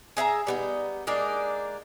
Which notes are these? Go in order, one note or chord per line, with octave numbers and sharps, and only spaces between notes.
G#4 E5 F5 A#5
G3 B3 D#4
G#3 A#3 D4 D#4